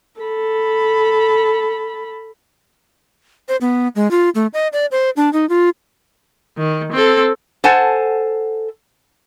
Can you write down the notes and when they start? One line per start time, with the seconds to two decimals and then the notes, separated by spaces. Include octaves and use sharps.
0.20 A4 B5
3.49 C5
3.61 B3
3.96 G#3
4.11 F4
4.35 A3
4.54 D#5
4.73 D5
4.91 C5
5.17 D4
5.33 D#4
5.49 F4
6.58 D#3
6.92 C4 A4
7.64 A4 C5 F#5 G#5 A5